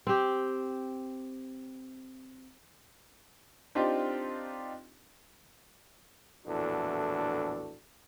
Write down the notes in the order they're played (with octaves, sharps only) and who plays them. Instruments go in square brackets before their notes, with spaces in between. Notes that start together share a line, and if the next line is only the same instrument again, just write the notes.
[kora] C4 G4
[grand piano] C4 D4 D#4 F4 G4
[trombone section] A#1 E2 A2 D4 F#4 A4